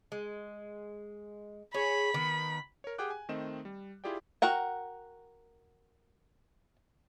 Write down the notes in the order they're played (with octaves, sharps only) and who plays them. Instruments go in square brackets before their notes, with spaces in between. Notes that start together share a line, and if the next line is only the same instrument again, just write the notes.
[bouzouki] G#3
[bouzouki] G#4 C#5 [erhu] B5
[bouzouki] D#3 B3
[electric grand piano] A#4 C#5
G4 G#4 F#5 G5 D6 F#6
G#5
D#3 A3 C4 D#5 E7
G3
E4 F4 G4 G#4 D5 G5
[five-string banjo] F#4 A#4 F#5 G5